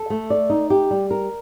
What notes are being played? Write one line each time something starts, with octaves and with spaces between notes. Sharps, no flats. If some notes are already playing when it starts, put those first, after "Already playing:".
Already playing: A4
A3
D5
D#4
G4
G3
A#4